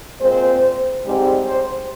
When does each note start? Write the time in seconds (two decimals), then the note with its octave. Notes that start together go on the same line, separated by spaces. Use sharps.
0.20 A#2 G#3 C4 C5
1.04 G#2 G3 C4
1.46 C5